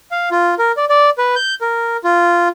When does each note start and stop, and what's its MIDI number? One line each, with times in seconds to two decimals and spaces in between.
0.11 0.29 77
0.31 0.55 65
0.59 0.72 70
0.77 0.85 74
0.89 1.10 74
1.18 1.35 71
1.36 1.55 91
1.61 1.97 70
2.04 2.48 65